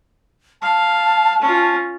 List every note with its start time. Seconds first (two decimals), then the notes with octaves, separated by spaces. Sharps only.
0.62 F5 A5
1.41 C#4 F4